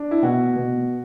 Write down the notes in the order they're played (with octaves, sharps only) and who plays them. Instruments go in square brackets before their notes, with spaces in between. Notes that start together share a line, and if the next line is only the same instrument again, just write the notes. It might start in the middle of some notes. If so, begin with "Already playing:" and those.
Already playing: [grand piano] D4
E4
B2 F#4
B2